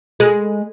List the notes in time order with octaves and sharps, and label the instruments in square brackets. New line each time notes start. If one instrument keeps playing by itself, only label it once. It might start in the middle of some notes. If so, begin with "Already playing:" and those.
[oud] G#3